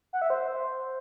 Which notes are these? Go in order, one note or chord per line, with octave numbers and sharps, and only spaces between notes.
F#5
E5
C5